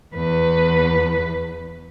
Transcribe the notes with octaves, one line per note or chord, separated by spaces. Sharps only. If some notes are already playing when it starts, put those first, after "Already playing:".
E2 B4